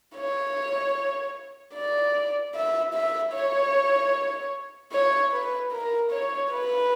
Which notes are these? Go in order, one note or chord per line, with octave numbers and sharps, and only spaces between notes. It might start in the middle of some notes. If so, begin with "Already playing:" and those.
C#5
D5
E5
E5
C#5
C#5
B4
A#4
C#5
B4